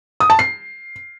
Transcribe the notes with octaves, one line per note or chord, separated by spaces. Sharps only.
D#6
A5
C7